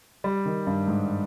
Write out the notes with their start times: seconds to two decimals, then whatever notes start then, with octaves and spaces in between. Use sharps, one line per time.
0.24 G3
0.46 D#3
0.67 G2
0.88 G#2